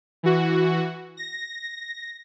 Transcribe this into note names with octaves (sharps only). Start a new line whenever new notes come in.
E3 F#4
A#6